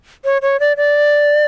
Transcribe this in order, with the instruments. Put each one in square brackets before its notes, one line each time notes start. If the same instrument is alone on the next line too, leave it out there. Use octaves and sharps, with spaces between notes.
[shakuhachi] C#5
C#5
D5
D5